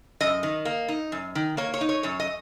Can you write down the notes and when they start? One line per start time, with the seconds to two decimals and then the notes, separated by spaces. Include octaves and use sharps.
0.20 F#2 D#5
0.43 D#3
0.65 A#3
0.88 D#4
1.12 F#2
1.35 D#3
1.57 A#3 C#5
1.74 C#5
1.81 D#4
1.89 C#5
2.03 F#2 C#5
2.20 D#5